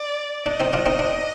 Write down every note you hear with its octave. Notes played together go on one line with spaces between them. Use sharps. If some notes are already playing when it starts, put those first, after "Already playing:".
Already playing: D5
D4 D#5
C4 D#4
D4 F4
C4 D#4
D4